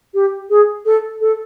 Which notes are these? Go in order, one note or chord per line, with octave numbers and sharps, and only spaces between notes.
G4
G#4
A4
A4